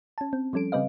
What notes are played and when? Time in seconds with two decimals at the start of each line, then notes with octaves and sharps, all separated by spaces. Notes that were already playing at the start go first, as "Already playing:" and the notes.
0.18 C#4 A5
0.33 C4
0.53 F3 G3 C#4 A4 D7
0.72 C#3 G3 C4 B4 D#5 F5